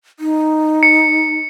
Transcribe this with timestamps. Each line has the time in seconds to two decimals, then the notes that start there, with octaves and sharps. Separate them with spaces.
0.19 D#4
0.83 C#7